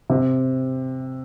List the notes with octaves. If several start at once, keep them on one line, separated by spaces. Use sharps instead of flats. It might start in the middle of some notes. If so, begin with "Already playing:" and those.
C3